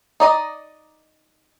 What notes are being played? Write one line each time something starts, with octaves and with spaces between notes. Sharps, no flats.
D#4 D5 D#5